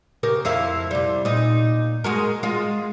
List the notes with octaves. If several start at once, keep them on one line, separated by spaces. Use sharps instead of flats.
C#3 G4 A#4
F2 E4 F5
C3 G3
A#2 D#4
G#3 F#4 A#4
G#3 F4